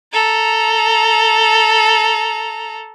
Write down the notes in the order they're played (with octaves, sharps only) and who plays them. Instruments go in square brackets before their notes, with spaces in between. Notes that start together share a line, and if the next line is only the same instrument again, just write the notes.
[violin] A4 A#5